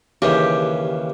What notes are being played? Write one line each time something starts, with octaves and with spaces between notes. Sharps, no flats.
D#2 C#3 E3 G4